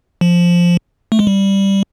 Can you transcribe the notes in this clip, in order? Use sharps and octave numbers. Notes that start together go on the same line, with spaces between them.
F3
A3
G#3
G3